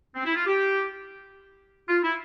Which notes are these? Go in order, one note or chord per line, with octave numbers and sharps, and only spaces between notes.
C4
E4
F4
G4
F4
E4